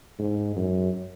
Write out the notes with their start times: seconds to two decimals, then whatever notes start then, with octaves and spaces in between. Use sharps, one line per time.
0.19 G#2
0.56 F#2